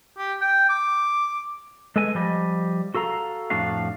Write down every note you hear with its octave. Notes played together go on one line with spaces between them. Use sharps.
G4
G5
D6
G#3 A4 B4 D#5 G#5
F3 G3 D#5
F#4 A4 F5 A#5
F2 A2 D4 F#4 F5